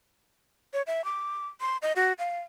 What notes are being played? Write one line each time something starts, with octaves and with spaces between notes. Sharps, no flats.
C#5
E5
D6
C6
D#5
F#4
F5